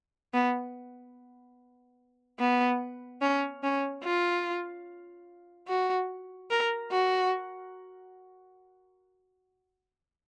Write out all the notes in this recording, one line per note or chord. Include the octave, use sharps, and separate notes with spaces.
B3
B3
C#4
C#4
F4
F#4
A#4
F#4